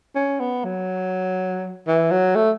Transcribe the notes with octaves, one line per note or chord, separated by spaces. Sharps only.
C#4
B3
F#3
E3
F#3
A3